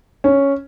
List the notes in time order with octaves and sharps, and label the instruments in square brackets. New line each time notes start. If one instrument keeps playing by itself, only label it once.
[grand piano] C#4